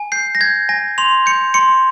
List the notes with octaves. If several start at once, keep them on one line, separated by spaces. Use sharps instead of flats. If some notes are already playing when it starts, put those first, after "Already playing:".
Already playing: G#5
G6 C7
A#6
G6 G#6
G#5 A#6
C6 F7
G6 C#7
C6 C#7